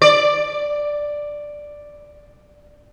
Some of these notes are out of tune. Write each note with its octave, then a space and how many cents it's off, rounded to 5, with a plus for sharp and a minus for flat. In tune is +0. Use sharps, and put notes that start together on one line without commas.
D5 +5